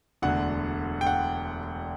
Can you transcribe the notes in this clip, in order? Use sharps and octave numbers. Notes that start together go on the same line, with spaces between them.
E1 D2 D3 F#5
G5
F#5